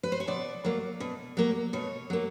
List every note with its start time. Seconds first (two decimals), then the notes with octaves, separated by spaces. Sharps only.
0.03 B4
0.12 C5
0.20 C#5
0.27 B2 D5
0.64 F#3 A#3
1.00 B2
1.37 F#3 A#3
1.73 B2 C#5
2.10 F#3 A#3